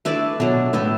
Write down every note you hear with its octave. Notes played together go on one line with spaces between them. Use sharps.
A3 D4 E4 B4 D5
B2 F#3 A3 D4
A2 B3 E4 A4